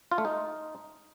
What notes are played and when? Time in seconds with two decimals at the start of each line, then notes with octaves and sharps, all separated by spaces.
0.12 F4
0.18 A3
0.25 D#4